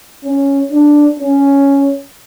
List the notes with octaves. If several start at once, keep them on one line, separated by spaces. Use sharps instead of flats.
C#4
D4
C#4